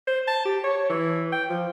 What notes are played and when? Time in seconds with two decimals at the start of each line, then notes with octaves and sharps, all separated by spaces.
0.07 C5
0.28 A5
0.46 G4
0.64 C#5
0.89 E3
1.32 G5
1.49 F3